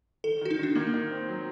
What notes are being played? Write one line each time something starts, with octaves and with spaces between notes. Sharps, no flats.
D#3 A4
D#3 F#4
D#4
D#3 D4
D#3 A#3
D#3
C4
F#3